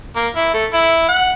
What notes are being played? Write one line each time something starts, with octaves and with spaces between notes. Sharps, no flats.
A#3
E4
A3
E4
F#5